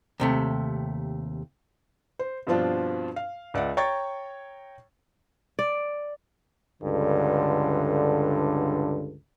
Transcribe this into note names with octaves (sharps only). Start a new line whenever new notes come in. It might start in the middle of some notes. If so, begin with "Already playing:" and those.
D#2 C3 A3
C5
G2 B2 F3 C4 D4 F4
F5
C#2 D5 E5 F#5
C#5 G5 A#5 C#6 G#6 A6
D5
C#2 G2 D3